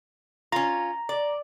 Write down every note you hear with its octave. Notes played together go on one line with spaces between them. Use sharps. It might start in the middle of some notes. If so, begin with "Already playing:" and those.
C#4 F4 A#5
D5